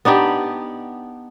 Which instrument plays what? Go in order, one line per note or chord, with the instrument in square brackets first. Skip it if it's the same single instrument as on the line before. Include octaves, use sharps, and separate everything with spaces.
[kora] B3 D4 D#4 G4